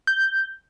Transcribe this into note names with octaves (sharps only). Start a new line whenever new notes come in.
G6